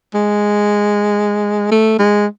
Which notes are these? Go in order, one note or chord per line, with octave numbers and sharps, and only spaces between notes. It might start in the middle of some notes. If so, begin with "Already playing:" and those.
G#3
A3
G#3